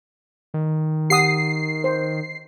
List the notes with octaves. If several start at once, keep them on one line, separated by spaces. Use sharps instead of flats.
D#3
G4 F#5 D#6 C7
C5